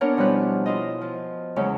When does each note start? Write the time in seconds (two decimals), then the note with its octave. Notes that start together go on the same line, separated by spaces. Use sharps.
0.01 B3 C#4 D4 A#4 C#5
0.17 B2 F3 G3 E4 B4 F#6
0.66 E4 F4 D#5
1.01 F3
1.56 E2 C#3 F#3 G#3 C#4 E4